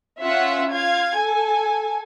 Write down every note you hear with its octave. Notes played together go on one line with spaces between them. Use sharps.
C#4 F4 E5 F#5
F4 F5 G#6
A4 G#5